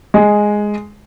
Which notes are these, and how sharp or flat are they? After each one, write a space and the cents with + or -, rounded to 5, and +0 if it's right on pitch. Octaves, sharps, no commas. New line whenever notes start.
G#3 +0